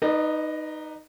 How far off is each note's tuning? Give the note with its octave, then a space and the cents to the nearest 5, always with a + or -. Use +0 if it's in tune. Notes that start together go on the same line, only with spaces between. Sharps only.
D#4 +0 B4 +0 D5 +40